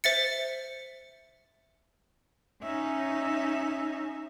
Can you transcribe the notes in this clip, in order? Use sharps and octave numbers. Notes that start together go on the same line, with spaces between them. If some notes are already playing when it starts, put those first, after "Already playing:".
C5 E5 A6 C#7
C#4 D#4 E5